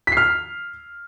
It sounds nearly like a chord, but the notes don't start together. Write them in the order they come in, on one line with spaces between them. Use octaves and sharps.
B6 C7 F6